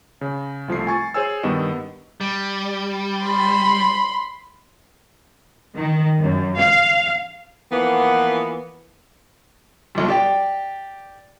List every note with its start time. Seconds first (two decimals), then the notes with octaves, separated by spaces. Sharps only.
0.21 C#3
0.68 C2 F3 A3 C7
0.87 G#5 C#6 A6
1.14 G#4 C5 C#5 G#5 E6
1.43 G2 D#3 B3 G4 D#5 E7
2.21 G3
3.23 B5 C6
5.74 D#3
6.19 F#2
6.59 F5
7.72 E3 F3 A#3 B3
9.95 B1 G2
10.08 G4 D5 G5